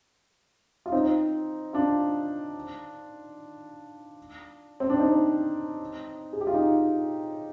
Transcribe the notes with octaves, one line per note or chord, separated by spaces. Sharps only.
F4
C4 D#4
D4 F4
C4
D4
C4 D#4
G#4
G4
F4
D#4